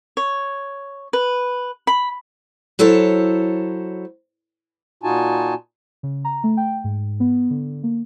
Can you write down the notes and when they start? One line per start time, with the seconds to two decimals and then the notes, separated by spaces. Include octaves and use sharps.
0.17 C#5
1.13 B4
1.87 B5
2.79 F#3 E4 A4 C5 C#5
5.03 A#2 D#4 F4 F#4 G#5 A5
6.03 C#3
6.25 A#5
6.44 A3
6.57 G5
6.84 G#2
7.20 B3
7.50 D3
7.83 A#3